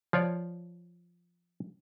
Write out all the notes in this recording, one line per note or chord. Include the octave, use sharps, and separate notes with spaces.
F3 F4 C#5 D5